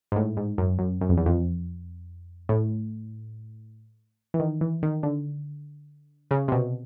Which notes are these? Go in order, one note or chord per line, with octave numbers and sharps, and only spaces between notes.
G#2
A2
G#2
F#2
F#2
F#2
F2
E2
F2
A2
E3
D#3
E3
D#3
D3
C#3
C3
B2